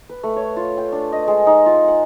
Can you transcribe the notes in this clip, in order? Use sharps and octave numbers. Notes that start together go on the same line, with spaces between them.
B4
A3
C#5
F4
G5
D4
D#5
G#3
D#4
F4
F#5